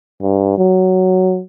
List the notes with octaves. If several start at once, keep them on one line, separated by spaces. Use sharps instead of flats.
G2
F#3